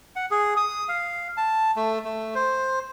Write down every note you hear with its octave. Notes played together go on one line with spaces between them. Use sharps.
F#5
G#4
D#6
F5
A5
A3
A3
C5